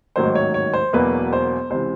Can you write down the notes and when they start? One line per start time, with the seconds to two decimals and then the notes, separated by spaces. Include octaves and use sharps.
0.16 A1 G#2 D#3 F#3 A#3 C5
0.35 C#5
0.54 C#5
0.73 C5
0.93 E1 E2 B2 F#3 A#3 B4
1.33 C5
1.70 C#2 C3 E3 C5